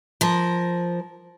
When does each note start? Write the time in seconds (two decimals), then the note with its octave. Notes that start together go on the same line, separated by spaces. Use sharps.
0.21 F3 A#4